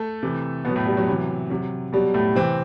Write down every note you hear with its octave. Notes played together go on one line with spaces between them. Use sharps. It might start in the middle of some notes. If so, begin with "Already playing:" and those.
Already playing: A3 A4
C3 E3
B2 B3
F#3
A2 A3
G3
F#3
C3 E3
C3 F#3
B2 F#3 G3
A2 A3
C3 E3 C4